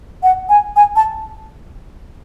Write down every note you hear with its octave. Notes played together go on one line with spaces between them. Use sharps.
F#5
G#5
G#5
A5